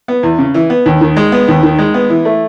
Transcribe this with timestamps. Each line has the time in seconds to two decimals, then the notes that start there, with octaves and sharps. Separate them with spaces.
0.08 B3
0.23 E2
0.39 C#3
0.54 E3
0.70 B3
0.86 D#2
1.01 D#3
1.16 G#3
1.32 B3
1.48 D#2
1.63 D#3
1.79 G#3
1.94 B3
2.10 E3
2.25 A3